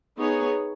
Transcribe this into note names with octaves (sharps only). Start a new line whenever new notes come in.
B3 D#4 G#4 C#5